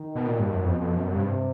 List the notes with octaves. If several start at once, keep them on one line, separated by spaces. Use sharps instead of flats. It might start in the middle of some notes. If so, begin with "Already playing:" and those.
Already playing: D#3
B2
A#2
G2
F#2
F2 B2
F2
F#2
G2 C3